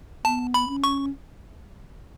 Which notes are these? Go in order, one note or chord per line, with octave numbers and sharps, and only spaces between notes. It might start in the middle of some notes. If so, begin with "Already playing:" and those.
B3 A5
B5
C#4
C#6